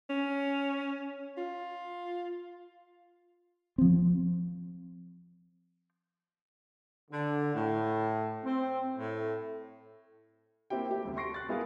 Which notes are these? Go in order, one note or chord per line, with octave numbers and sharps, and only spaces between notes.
C#4
F4
F3 C4
D3
A2
C4
A2
A#3 C4 E4 G4 G5
A3 G4 E5
D2 C3
C6 C#6 A#6 C7 D7
F#6 A6
G#3 B3 E4 G#4 A#4 F5